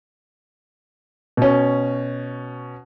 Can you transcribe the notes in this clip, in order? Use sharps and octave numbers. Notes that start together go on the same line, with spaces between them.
B2 C#4